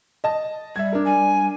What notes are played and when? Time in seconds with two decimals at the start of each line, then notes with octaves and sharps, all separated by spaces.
0.24 D#5 A5
0.76 G3 E5 G#6
0.92 D4 A#4
1.05 G3 G#5